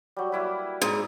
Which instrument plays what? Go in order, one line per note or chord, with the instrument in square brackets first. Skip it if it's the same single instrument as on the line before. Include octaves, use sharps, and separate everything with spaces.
[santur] F#3 G3
A#3 E4 B4
[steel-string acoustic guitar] G#2